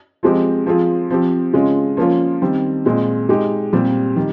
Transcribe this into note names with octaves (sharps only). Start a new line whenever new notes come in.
F3 G#3 C4 G4
F3 C4 F4 G#4
F3 C4 G4
C#3 G#3 C#4 F4
F3 A#3 C#4 F4
D#3 G3 C4
A#2 G#3 C4
G#3 D#4 G4
A#2 G3 C4 G4
D#3 G3